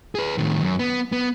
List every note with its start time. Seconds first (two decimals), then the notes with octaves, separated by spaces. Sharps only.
0.15 G#4 B4
0.38 A2 D#3
0.61 F#2
0.79 B3
1.12 B3